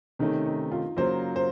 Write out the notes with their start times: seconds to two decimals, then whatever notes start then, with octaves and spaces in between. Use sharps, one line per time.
0.19 C3 D#3 A3 C#4 D#4
0.45 D#4
0.72 F4
0.97 C#3 F#3 A#3 F4 C5
1.36 C5